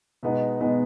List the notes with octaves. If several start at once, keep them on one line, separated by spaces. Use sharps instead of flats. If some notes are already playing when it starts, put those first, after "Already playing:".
B2 G#3 B3 D#4
B2 G#3 B3 D#4